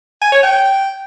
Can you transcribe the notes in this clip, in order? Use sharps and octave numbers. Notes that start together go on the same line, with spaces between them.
G#5
C#5
G5